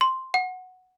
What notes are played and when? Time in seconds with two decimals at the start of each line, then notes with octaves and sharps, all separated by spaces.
0.01 C6
0.34 F#5